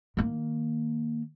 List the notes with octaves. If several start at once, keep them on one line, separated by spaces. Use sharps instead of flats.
D#3 A#3